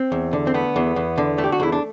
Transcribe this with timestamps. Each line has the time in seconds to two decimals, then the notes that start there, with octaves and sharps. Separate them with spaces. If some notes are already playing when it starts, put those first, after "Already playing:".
Already playing: C4
0.12 E2
0.33 D3
0.47 C4
0.54 A3 B3
0.76 E2
0.96 E2
1.18 D3
1.38 A3
1.44 G4
1.52 F#4
1.60 E2 E4
1.72 D4